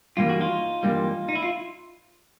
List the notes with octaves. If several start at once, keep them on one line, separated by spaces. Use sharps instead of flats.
G2 E3 G3 A#3 F4
F#4
D#4 F4
G2 E3 G3 A#3
D#4
E4
F4